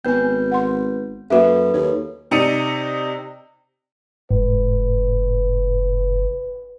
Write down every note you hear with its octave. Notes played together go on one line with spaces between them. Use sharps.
G#1 B3 B4 G#5 G6
F#5 C6
F#2 A#3 F#4 A4 B4 E5
D#2 C#5
C3 D#4 D5 C#7 D#7
F1 G#2 B4